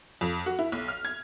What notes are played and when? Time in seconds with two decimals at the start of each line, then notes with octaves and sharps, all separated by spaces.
0.21 F2
0.46 F#4
0.59 E4
0.72 B1
0.88 F6
1.05 G#6